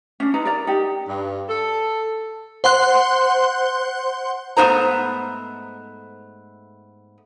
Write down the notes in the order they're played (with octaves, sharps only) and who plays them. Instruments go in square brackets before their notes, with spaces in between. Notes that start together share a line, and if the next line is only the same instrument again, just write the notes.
[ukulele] C#4 D4
D#4 B4 A#5
A#4 D5 A#5
D#4 G4
[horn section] G2
A4
[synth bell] C5 F#5 C6 F#6
[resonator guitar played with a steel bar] G#2 A3 B3 D#4 C5 A#5